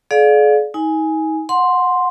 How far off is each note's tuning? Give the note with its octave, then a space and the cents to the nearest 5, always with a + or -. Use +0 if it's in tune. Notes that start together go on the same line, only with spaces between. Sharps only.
G#4 +40 D5 +5 F5 +25
D#4 +35 G#5 +0
F#5 -20 C6 +0